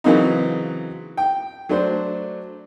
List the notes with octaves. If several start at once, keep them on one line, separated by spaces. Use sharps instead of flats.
C#3 E3 F#3 A#3 C4 D#4
G5
F#3 A3 D4 C5